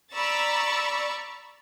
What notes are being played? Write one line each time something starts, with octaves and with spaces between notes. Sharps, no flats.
D5 A#5 B5 C#6 E6 A6